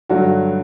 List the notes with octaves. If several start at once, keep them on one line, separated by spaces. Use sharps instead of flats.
G2 D3 F#3 A3 F#4